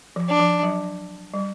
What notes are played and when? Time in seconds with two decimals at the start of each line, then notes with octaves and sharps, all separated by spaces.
0.16 F3
0.29 D4
0.40 F3
0.63 F#3
1.34 G3